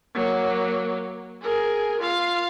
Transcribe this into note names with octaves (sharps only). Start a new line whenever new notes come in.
F#3 A#3
G#4 A#4
F4 F5